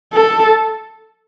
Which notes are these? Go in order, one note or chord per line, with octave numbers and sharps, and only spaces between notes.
A4